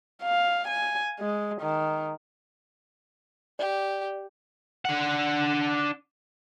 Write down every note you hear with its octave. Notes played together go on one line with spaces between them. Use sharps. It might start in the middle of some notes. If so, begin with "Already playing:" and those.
F5
G#5
G#3
D#3
G4 D5
D4 F#5